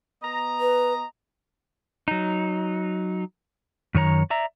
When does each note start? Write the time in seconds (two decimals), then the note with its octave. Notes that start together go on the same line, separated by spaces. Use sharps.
0.22 B3 D#5 A#5
0.61 B4
2.08 F#3 D#4
3.94 F#2 D#3 C#5 A#5
4.30 D5 E5 A#5